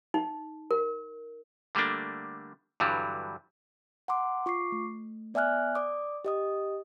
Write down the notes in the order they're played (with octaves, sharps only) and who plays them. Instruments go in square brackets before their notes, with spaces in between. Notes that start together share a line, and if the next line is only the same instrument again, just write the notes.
[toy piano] D#4
A#4
[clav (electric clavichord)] D3 G3 A3 A#3 D4
G2 D3 E3 F#3 G3
[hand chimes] F#5 A#5 C6 D6
F4 C#6 D6 C7
A3
B3 D5 E5 G#5 F6 F#6
D5 D6 D#6
G4 D#5 D#6